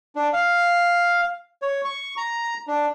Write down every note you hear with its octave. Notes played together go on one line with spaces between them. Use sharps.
D4
F5
C#5
C#6
A#5
D4